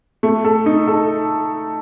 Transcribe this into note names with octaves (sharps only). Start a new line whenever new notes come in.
A3
A4
D#4
A4